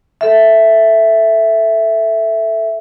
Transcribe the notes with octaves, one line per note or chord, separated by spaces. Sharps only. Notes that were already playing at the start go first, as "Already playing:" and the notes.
A4 E5